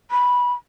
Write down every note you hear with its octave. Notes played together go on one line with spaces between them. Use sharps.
B5